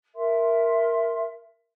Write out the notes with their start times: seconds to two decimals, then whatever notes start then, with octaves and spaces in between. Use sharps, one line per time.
0.16 A#4 E5 C6